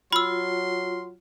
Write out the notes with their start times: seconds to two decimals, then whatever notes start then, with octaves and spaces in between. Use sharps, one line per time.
0.13 F#3 F4 B5 C6 E6